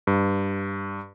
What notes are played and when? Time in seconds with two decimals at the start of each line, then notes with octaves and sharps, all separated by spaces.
0.07 G2